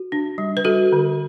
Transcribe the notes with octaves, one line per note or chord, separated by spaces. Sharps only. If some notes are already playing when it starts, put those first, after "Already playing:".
Already playing: F#4
D4
G3
B4
G3 F#4 A4
D3